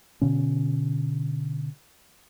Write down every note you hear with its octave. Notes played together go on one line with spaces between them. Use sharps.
B2 D3 C#4